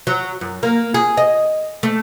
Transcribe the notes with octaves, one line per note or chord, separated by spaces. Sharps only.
F#3
F#2
A#3
G#4
D#5
A3